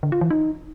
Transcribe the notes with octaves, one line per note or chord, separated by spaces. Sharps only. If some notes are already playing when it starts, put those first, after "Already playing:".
D3
F4
E3
D#4